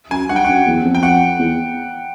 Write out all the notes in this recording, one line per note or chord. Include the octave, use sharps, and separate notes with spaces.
F#2 G#5
G2 F#5
G5
F#2 F#5
E2
F2
G5
F#5
E2